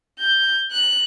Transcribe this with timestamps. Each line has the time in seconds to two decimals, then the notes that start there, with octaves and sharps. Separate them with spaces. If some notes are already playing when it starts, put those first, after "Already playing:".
0.19 G6
0.72 F#6